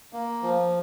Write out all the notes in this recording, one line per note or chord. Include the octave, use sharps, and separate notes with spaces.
A#3
F3